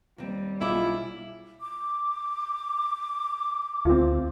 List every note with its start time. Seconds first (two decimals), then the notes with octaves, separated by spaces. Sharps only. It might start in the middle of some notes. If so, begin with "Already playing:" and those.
0.18 D#2 G3 C4
0.61 B1 C#4 E4 F4 G#4 D6
1.61 D6
3.85 D2 C4 F4